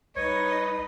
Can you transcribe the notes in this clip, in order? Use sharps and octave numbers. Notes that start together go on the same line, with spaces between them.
C2 D#4 B4 C#5 D#5